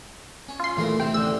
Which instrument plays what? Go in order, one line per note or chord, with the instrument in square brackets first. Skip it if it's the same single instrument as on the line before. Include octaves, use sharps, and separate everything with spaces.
[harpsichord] C#4
[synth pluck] F4 C6
[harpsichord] A#1 A3 A#4 [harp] E3
[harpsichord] C3 C4 [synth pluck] G5
[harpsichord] A1 D3 [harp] C6 F#6 [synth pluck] E6